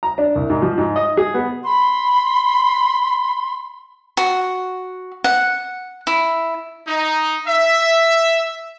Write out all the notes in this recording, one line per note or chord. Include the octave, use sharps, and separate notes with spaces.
A#5
D4
C2
G#2
F3
G#2
D#5
G#4
B3
B5 C6
F#4
F#5
E4
D#4
E5